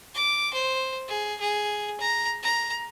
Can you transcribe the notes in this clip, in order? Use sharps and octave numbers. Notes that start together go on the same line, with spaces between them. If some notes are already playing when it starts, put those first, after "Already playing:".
D6
C5
G#4
G#4
A#5
A#5